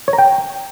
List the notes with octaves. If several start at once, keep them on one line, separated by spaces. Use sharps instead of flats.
C#5
A#5
G5